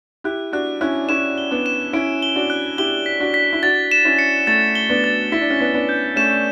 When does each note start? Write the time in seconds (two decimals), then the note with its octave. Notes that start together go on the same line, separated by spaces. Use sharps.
0.24 E4 G4 F#6
0.52 D4 F#4 F#6
0.81 C#4 E4 F#6
1.09 C#4 E4 E7
1.38 G7
1.51 B3 D4
1.66 E7
1.93 C#4 E4 D7
2.22 G7
2.36 D4 F#4
2.50 F#6
2.78 E4 G4 G7
3.06 B6
3.20 D4 F#4
3.34 B6
3.53 E4
3.63 D4 F#4 A6
3.92 E7
4.05 C#4 E4
4.19 C#7
4.47 A3 A6
4.75 G7
4.89 B3 D4
5.04 A6
5.32 E4 B6
5.41 D4
5.50 C#4
5.60 B3 D4 B6
5.74 B3 D4
5.89 G6
6.16 A3 C#4 E7